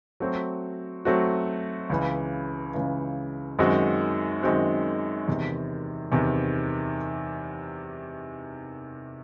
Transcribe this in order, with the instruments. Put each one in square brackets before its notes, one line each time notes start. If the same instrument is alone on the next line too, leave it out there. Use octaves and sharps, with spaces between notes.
[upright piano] F#3 A3 C4 F#4
F#3 A3 C4 F#4
C#2 C#3 E3
C#2 C#3 E3
F#2 D#3 G#3 C4 F#4
F#2 D#3 G#3 C4 F#4
E2 C3 D#3
E2 C3 D#3